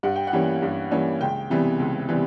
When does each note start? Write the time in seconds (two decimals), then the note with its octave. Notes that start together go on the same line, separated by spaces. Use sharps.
0.03 G2 F#5
0.16 G5
0.27 F#5
0.33 E3 G3 A#3 C#4
0.62 G2
0.91 E3 G3 A#3 C#4
1.21 C#2 G5
1.50 C3 E3 G3 B3
1.79 C#2
2.09 C3 E3 G3 B3